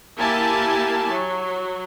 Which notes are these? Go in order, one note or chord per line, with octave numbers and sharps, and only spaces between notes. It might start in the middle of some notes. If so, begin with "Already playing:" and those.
A#3 E4 G4 G#5 A5
F#3